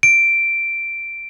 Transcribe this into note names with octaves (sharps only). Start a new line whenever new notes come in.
D7